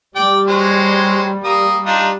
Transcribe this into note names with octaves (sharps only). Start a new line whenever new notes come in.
G3 D5 G5 D6
F#3 G#3 C5
A#3 D#6
D4 D#4 F4